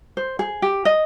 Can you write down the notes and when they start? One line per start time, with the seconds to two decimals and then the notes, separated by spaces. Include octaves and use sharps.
0.17 C5
0.39 G#4
0.62 G4
0.85 D#5